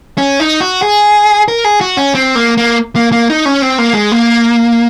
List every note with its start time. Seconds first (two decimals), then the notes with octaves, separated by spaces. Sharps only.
0.18 C#4
0.40 D#4
0.60 F#4
0.82 G#4
1.48 A#4
1.64 G#4
1.81 F#4
1.97 C#4
2.15 C4
2.35 A#3
2.57 A#3
2.96 A#3
3.12 A#3
3.30 D#4
3.46 C#4
3.62 C4
3.78 A#3
3.94 G#3
4.12 A#3